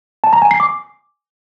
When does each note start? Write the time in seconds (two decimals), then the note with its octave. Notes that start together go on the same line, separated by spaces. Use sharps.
0.24 A5
0.33 A#5
0.42 G#5
0.51 C7
0.60 D6